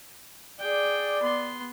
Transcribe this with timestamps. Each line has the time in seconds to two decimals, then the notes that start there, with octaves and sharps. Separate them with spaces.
0.59 G#4 D5 G5
1.22 B3 C6